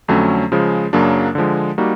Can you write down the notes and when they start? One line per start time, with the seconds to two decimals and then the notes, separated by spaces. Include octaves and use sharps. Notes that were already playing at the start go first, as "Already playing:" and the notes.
0.08 F2 D3 F#3 A3 C#4
0.52 C#3 F3 G#3
0.93 F#2 C#3 F#3 A#3 D4
1.35 D3 F3 G#3
1.78 G3 A#3 D#4 F#4